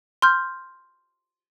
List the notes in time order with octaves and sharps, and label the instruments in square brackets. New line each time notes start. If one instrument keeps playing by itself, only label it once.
[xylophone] C6 F6 G6